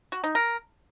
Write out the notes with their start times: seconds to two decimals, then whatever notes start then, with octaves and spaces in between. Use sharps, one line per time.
0.12 F#4
0.24 D#4
0.35 A#4